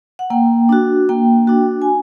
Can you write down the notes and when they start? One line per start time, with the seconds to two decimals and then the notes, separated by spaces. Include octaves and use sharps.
0.19 F#5
0.30 A#3 G5
0.69 D4 F#4
1.09 A#3 G5
1.47 D4 F#4
1.82 G#5